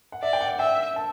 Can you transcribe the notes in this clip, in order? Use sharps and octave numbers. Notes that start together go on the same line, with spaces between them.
F#5
D5 E5
G5
F#5
E5 G5
A5